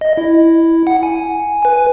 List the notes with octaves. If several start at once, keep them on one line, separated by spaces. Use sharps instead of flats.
D#5
E4
F#5
G#5
B4